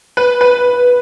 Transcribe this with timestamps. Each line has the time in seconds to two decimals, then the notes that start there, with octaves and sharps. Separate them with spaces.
0.17 B4
0.41 B4